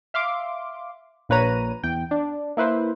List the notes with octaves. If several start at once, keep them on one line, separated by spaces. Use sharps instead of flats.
E5 F5 C6 D6
A#1 A#3 B4 C#5 A#5 D#7
E2 G5
D4
A#3 E4 B4 C5